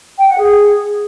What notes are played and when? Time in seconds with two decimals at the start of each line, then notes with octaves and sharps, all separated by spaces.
0.17 G5
0.28 F#5
0.39 G#4